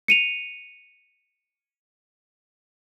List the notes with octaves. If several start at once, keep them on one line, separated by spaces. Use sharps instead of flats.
C#7 D#7 F7